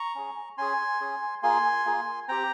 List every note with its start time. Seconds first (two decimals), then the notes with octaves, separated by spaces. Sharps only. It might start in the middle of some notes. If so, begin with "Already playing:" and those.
Already playing: A#5 C#6
0.15 C#4 G#4
0.58 C#4 G#4 G#5 C6
1.01 C#4 G#4
1.43 A#3 F4 G#4 G#5 C6
1.85 A#3 F4 G#4
2.28 C4 G4 G5 A#5